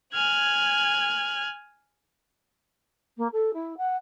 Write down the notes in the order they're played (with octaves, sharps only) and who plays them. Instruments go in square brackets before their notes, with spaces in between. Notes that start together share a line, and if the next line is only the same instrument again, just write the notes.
[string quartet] G#5 F6 F#6 G#6
[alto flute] A#3
A4
E4
F#5